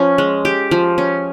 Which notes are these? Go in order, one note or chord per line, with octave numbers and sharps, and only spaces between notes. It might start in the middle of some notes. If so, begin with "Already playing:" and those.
Already playing: F3 C#4
G#3
G4
F3
C#4